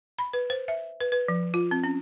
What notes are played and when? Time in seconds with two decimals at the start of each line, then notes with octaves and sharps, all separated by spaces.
0.19 B5
0.33 B4
0.50 C5
0.68 E5
1.01 B4
1.12 B4
1.28 F3
1.54 F4
1.71 C4
1.84 C#4